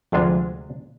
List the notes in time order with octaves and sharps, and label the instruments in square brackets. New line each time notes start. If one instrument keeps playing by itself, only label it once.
[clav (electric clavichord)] D2 C3 G#3 D4 F4 [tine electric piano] F3